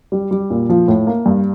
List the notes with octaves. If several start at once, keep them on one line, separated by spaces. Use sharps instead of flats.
G3
G3
A#2
F3
A2
A#3
G2